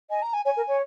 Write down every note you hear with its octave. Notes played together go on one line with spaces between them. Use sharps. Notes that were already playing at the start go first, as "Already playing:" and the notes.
D#5 G#5
A#5
G#5
C#5 G#5
A#4
C#5